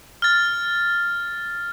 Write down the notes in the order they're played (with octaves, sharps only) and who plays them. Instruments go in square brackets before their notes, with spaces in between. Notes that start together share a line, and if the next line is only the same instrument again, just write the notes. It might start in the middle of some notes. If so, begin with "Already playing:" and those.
[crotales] F6 A6